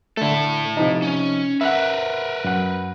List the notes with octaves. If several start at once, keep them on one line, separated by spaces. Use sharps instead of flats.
D3 A3 E4 A4
C3 F3 D#4
C#4
A#4 B4 E5 F#5
F#2 F#5